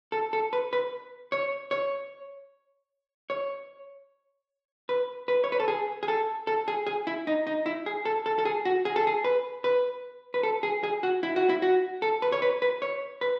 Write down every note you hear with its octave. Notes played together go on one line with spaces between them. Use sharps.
A4
A4
B4
B4
C#5
C#5
C#5
B4
B4
C#5
B4
A4
G#4
G#4
A4
A4
G#4
G#4
E4
D#4
D#4
E4
G#4
A4
A4
A4
G#4
F#4
G#4
A4
G#4
B4
B4
B4
A4
G#4
G#4
F#4
E4
F#4
E4
F#4
A4
B4
C#5
B4
B4
C#5
B4